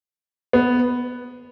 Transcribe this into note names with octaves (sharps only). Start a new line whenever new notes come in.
B3